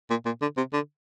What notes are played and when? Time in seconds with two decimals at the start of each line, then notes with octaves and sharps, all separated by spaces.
0.10 A#2
0.26 A#2
0.42 D3
0.57 C3
0.73 D3